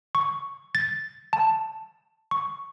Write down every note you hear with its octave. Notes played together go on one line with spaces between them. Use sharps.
C#6
A6
A5
C#6